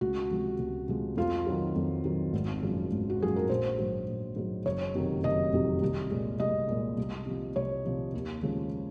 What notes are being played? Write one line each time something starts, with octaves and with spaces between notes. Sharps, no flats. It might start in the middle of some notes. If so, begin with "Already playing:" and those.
C#2 F#4
C3 F3 G#3
C#2
C3 F3 G#3
F2 F4
D#3 F#3
F2
D#3 F#3
G#1
F#2 F3 G#3
G#1
F#4
F#2 F3 G#3 G#4
A#4
A#1 C5
G#2 F#3
A#1
G#2 F#3
F#1 C#5
F2 C3 D#3 F#3
F#1 D#5
F2 C3 D#3 F#3
C2
A#2 G#3
C2 D#5
A#2 G#3
C2
C3 F3
C2 C#5
C3 F3
D#2
C#3 F3 G#3